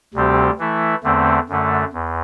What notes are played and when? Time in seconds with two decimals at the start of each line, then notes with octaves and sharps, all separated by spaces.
0.14 D2 C3 G3 C4 G4
0.59 E3 A3 E4
1.03 E2 D3 A3 C4
1.49 F#2 D3 A3
1.92 E2